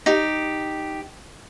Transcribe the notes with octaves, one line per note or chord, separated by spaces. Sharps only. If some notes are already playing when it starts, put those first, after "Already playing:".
D#4 G4